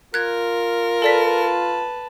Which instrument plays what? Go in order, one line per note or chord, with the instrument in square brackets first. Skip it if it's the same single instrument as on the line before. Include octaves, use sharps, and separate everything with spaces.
[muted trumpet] F4 [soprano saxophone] A#4 [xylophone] F#6 G#6
[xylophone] A4 D5 B6 [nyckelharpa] B4 A5